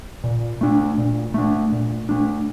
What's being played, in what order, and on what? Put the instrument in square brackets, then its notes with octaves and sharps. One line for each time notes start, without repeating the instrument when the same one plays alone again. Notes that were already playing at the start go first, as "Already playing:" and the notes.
[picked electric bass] A#2
A3 D4
A#2
A3 D4
A#2
A3 D4